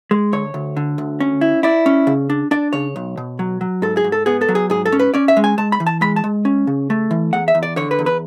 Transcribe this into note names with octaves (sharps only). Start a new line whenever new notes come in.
G#3
D2 C#5
D2
D3
D2
C#4
E4
E4 D5
C#4
C#3
D4
D4 D5
C#3 C#5
B1
B2
F#3
F#3
G#2 A4
G#4
G#2
A4
B3 G#4
A4
F#3
G#4
G#2 G#4
A4
C#4
B4
C#4 D5
E5
G#3
G#5
G#3 A5
B5
E3
A5
G#3 B5
A5
G#3
C#4
C#3
A3
E3
E2 F#5
E5
E2
D5
D3 C#5
B4
E2
B4